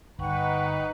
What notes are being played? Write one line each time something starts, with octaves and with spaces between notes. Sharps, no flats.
G1 D#4 B4 F#5 G5 C#6